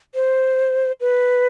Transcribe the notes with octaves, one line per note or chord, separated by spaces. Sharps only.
C5
B4